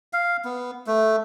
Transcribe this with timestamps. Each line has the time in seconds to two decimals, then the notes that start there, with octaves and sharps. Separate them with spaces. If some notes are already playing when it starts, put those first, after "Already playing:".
0.13 F5
0.45 B3
0.87 A3